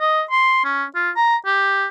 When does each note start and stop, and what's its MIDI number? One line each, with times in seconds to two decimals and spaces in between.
0.01 0.23 75
0.31 0.61 84
0.65 0.85 61
0.96 1.11 65
1.17 1.36 82
1.46 1.87 67